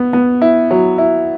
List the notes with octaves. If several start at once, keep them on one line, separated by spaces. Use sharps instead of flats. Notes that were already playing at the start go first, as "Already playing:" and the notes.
Already playing: B3
B3
E4
F#3
E4